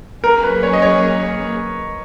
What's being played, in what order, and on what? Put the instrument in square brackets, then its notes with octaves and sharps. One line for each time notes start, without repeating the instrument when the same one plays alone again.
[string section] F#3 A#3 C#4 G#4 [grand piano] A#4
[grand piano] B4
C#5
D#5
C#5